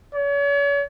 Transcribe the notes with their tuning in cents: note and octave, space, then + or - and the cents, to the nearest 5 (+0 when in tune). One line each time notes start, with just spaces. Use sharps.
C#5 +40